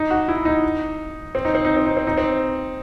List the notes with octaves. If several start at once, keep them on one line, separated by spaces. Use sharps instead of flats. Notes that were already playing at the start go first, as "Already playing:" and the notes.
Already playing: D#4
F#4
E4
D#4
C4
D#4
C4
D#4
C4
D#4
C4
D#4
C4